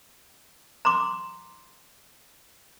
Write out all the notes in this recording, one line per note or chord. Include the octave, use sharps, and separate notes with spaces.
A#5 C6 D6